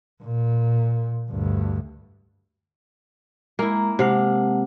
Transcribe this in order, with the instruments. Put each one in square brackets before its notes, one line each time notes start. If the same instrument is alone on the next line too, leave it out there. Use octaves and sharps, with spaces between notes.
[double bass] A#2
D2 G2
[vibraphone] G#3 A#5 [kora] A#3 E4
[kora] C3 F5 [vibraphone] G#3 F#5 A5